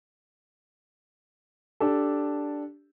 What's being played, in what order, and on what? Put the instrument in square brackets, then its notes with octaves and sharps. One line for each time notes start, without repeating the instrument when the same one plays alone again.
[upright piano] D4 G4 A4